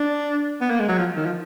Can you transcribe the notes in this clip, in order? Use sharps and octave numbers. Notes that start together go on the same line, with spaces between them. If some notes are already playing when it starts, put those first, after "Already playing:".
Already playing: D4
B3
A#3
G#3
F#3
F3
D#3
F3